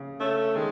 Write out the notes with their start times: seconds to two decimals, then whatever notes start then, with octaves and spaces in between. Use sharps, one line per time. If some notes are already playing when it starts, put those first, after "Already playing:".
Already playing: C#3
0.20 A3 C#4
0.56 D#3 G#3